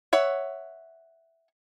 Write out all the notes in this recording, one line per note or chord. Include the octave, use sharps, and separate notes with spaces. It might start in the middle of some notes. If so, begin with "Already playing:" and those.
C#5 E5 F#5